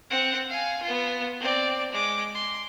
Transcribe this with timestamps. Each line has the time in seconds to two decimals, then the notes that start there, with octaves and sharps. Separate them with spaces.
0.10 C4 F#5
0.50 F5 G#5
0.83 B3 F4
1.40 C4 D5
1.92 G#3 D6
2.35 C6